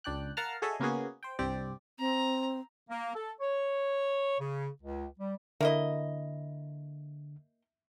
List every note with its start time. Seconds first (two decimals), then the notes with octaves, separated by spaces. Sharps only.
0.04 C#2 D4 D5 G5 F#6
0.37 A#4 F5 F#5 A5 A#5 F6
0.62 F#4 G#4 A4 C#5 D#5 E5
0.80 C#3 A#3 B3 C#4 F#4 G#4
1.23 C5 G5
1.39 C2 G2 C4 G4 D5
1.99 C4 A#5
2.89 A#3
3.15 A4
3.41 C#5
4.40 C#3
4.82 C#2
5.19 G3
5.61 D3 A#3 E4 D#5 E5